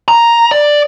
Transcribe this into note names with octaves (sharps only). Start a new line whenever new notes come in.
A#5
D5